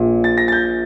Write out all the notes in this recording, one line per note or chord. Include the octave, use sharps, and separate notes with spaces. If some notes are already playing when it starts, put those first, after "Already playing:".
Already playing: A#1 A#2
A6
A#6
A6
G6